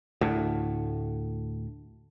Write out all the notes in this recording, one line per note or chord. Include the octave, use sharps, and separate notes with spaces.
D2 A2